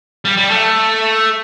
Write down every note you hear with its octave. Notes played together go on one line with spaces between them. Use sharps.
G3
G3
A3